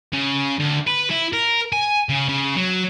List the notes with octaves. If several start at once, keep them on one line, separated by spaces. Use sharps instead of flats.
C#3
D2
B4
E4
A#4
G#5
C#3
C#3
F#3